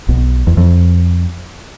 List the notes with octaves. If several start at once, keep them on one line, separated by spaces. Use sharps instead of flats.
B1 B2
E2
F2